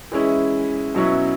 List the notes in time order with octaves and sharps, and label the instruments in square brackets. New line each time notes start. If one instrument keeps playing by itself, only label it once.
[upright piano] E3 G#3 C#4 E4
B2 F#3 C#4 E4